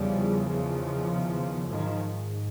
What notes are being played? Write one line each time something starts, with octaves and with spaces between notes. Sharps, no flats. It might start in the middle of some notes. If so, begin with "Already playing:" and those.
Already playing: E2 C#3 F3 G3
D#3 F3
G#2 D#3 F3